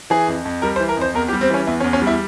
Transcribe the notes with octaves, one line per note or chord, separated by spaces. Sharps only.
E3 G#4
F2
F2
G3 A#4
C5
E3
A#4
F2 C5
E2 A#4
G4
G3
C4
E3 C#4
E2 E4
C#4
E2
C#4
G3
E4